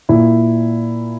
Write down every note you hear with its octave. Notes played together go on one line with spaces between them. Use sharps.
A#2 E4